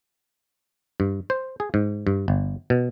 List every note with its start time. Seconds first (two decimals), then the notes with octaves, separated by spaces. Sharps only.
1.00 G2
1.30 C5
1.60 G#4
1.74 G#2
2.07 G2
2.28 G1
2.70 B2